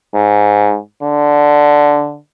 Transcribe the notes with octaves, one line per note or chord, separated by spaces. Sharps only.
G#2
D3